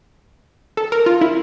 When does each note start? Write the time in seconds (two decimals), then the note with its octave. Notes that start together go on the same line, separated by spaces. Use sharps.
0.77 A4
0.92 A#4
1.06 F4
1.21 E4